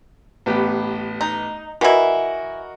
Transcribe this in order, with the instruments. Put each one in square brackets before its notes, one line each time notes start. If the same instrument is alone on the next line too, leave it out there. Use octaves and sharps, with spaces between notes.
[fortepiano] A1 B3 G4
[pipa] D#4
[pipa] E3 E4 [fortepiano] F#4 A#4 D#5